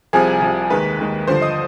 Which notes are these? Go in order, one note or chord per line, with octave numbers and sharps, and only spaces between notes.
C2 C3 F3 G#4 G#5
C2 C3 F3
D#2 D#3 G#3 B4 B5
D#2 D#3 G#3
G2 D3 F3 C5 C6
D#5 D#6